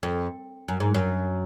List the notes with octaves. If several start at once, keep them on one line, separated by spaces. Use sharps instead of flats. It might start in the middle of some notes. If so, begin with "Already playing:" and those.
F2
F#2
G#2
F#2